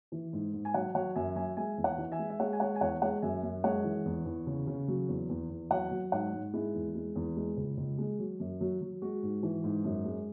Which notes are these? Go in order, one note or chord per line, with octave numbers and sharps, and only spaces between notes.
E3
G#2
G#2
G#5
F#3 C#5 F#5
F#3 C#5 F#5
F#2 E5 G#5
F#3 E5 G#5
G#3 E5 G#5
E2
C#5 F#5
E3
E5 G#5
G#3
E5
G#3 C#5 F#5
G#5
G#3 C#5 F#5
G#5
E2 C#5 F#5
G#3 C#5 F#5
F#2 E5 G#5
F#2
G#3 C#5 F#5
E3
E2
E2
C#3
C#3
F#3
E2
E2
E2
F#3 C#5 F#5
F#3
G#2 C#5 F#5
G#2
G#3 E4
E2
G#3
E2
G#3
C#2
C#2
G#3
F#3
F#2
F#3
F#3
G#3 F#4
G#2
E3
G#2
F#2
G#3